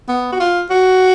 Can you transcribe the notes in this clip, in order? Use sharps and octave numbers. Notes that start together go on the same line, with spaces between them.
B3
F#4
F4
F#4